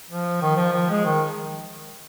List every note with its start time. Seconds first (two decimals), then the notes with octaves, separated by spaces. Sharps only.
0.10 F3
0.42 D#3
0.57 F3
0.73 F3
0.89 G#3
1.05 D#3